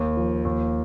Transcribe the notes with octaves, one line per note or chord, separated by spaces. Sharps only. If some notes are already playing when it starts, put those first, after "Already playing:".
Already playing: D#2
F3
D#2